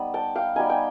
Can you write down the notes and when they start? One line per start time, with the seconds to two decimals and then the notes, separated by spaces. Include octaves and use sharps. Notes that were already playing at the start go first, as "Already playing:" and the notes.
Already playing: G3 B3 D#4
0.14 G5 A5
0.35 F5 G5
0.56 G3 B3 D#4 G#5
0.70 G5